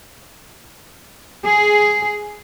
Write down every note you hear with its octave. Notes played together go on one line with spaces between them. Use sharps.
G#4